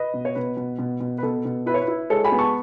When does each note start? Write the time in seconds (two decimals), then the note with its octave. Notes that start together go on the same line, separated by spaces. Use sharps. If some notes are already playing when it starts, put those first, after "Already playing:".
Already playing: B4 D#5
0.14 B2
0.25 C#5
0.35 B2 B4
0.57 B2
0.79 B2
1.01 B2
1.18 B4
1.23 B2 A4
1.45 B2
1.66 E4 B4
1.74 C#5
1.81 B4
1.88 E4
2.10 G#3 A4 C#5
2.24 G#5 B5
2.32 B3
2.39 A5 C#6